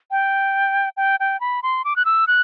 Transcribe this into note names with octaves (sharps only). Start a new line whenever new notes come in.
G5
G5
G5
B5
C6
D6
F#6
E6
F#6